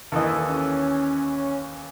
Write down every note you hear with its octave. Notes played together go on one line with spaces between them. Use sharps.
D#2 E3 A4 D#5
C#4